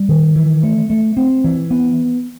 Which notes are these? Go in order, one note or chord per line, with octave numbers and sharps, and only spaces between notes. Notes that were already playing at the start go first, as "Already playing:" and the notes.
Already playing: G3
D#3
E3
A3
A3
C4
E3
B3